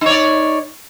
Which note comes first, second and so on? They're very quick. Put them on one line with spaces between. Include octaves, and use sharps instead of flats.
D#4 C#5 D5